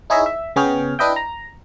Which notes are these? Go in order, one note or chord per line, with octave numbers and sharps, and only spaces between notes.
D#4 E4 G#4 C#5 D#5 E5
E5
C#3 B3 G#4 C#5 G5 F6
D4 E4 B4 D#5 E5 G5
A#5